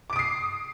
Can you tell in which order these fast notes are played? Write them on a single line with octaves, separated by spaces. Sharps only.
D6 D7 D#6 C7